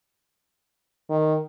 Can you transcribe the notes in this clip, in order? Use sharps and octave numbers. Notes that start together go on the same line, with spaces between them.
D#3